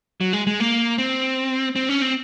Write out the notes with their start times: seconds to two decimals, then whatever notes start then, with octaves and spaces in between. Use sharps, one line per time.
0.21 F#3
0.33 G#3
0.47 G#3
0.60 A#3
0.98 C4
1.76 C4
1.89 C#4
2.02 C4